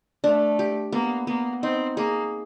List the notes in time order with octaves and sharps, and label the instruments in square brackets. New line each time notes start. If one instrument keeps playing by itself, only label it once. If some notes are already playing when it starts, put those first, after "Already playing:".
[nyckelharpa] A3 [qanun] D4
[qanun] G4
[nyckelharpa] A#3 [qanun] B3
[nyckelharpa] A#3 [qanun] B3
[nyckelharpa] C4 [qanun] D#4
[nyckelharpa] A#3 [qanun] G#4